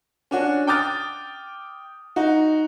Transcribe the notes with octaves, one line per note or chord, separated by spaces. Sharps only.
C#4 D4 F#4
G5 D6 D#6 F6 A6
D#4 F#4